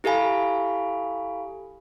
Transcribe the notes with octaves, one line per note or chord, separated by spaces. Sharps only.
E4 G4 A4 F5 G#5 B5